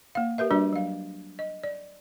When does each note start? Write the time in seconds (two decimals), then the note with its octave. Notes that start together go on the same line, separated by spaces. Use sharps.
0.15 A#3 F5
0.38 G4 A#4 B4 E5
0.51 G3 D4 F#4 B4 D5
0.73 F#3 F5
1.39 D#5
1.64 D5